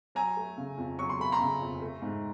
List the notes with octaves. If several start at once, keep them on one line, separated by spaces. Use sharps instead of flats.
F#3 G#5 A#5
A3
C#3
F2
F#3 C#6
C6
A3 B5
A#5 C6
C#3
F2
A3
G#2